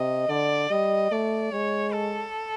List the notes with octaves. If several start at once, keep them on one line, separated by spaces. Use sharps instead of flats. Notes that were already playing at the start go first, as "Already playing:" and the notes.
Already playing: C3 D#5
D3 D5
G3 D#5
A3 D5
G#3 C#5
A4